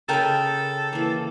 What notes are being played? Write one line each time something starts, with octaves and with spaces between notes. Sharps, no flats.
C#3 A4 A#4 D#5 G5 B5
E3 A#3